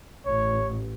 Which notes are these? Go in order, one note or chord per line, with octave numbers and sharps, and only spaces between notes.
A1 C#5